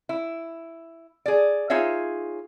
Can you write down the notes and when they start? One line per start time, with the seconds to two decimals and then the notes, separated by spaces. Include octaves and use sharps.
0.09 E4
1.26 G#4 D5
1.70 D#4 F4 G#4 C#5 E5